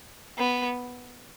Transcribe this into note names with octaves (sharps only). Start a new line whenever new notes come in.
B3